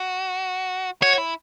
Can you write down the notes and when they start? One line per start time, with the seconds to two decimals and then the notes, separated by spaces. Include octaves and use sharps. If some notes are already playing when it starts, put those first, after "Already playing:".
Already playing: F#4
1.02 F#4 C#5
1.18 E4